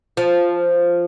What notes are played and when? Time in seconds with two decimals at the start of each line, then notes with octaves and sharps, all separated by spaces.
0.17 F3